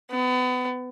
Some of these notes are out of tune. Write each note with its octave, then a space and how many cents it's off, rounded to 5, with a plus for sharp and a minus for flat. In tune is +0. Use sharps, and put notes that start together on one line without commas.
B3 +30